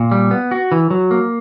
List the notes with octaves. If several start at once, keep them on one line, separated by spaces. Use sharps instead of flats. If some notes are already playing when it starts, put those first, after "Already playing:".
Already playing: A#2
G3
B3
F#4
E3
F#3
A#3